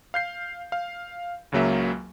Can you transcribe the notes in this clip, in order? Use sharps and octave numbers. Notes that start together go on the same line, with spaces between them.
F5 G6 C7
F5
C#2 C#3 F#3 A#3 E5